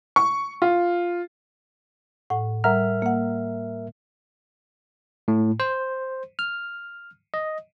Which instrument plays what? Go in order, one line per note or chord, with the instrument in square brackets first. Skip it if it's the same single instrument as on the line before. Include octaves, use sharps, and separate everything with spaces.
[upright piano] C#6
F4
[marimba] A2 F#5
[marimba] G3 F#5 A#5 [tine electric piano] A#4 E5 F6
[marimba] A#3 F#5
[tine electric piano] A2
C5
F6
D#5